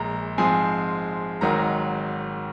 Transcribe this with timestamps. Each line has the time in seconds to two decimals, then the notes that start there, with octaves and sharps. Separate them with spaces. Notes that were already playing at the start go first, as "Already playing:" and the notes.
Already playing: A#1 A#2 G#3 A#5
0.38 G#2 F3 G#3 C4 G#5
1.41 G#1 G#2 D#3 F#3 A#5